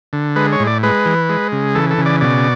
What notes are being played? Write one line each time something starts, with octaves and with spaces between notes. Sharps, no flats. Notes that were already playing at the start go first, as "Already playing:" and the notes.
D3
G#3 B4
C#5
A2
D5
G#3 B4
E3
G#3
C#3
E3 A4
A4
C#3
D5
B2 D5